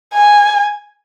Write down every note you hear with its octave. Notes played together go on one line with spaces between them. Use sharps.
G#5